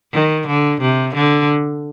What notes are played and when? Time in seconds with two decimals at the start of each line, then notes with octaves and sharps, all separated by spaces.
0.13 D#3
0.47 D3
0.81 C3
1.15 D3